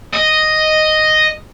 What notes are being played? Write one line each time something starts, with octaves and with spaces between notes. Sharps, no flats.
D#5